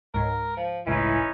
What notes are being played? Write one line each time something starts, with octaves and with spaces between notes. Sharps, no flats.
C#2 G#2 A#4
F3
G1 C#2 A2 E3 C#4 D#4 E4